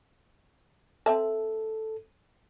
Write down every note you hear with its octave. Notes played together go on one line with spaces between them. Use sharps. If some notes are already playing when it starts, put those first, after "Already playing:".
C4 A4 E5 A5